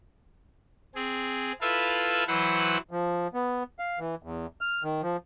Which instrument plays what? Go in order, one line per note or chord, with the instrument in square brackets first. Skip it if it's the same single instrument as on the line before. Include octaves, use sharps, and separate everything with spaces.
[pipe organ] C4 G#4
E4 F4 A4 B4 E5 F5
E3 F#3 B4 C5 F#5 E6
[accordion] F3
B3
F5
E3
E2
F6
D#3
F3